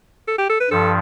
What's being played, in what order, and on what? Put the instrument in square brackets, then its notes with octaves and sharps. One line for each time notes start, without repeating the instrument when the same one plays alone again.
[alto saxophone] A4
G4
A4
B4
[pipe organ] G2 F3 [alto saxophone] A4